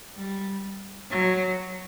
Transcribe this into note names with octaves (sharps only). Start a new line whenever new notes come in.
G3
F#3